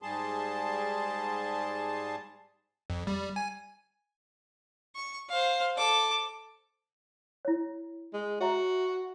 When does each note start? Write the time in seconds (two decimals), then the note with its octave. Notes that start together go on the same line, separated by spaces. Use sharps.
0.02 G#2 G3 G#4 A5 C6
2.90 F2
3.07 G3
3.36 G#5
4.95 C#6
5.29 C5 F5
5.77 A4 D6
7.45 E4 C#5
8.13 G#3
8.40 F#4 C#5 E5 A#5